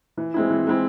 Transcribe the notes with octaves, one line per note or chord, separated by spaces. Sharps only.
E3
G#3 C4 E4
E3
G#3 C4 E4